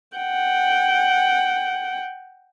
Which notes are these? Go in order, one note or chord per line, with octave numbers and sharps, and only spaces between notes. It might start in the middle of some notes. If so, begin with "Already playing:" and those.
F#5 G5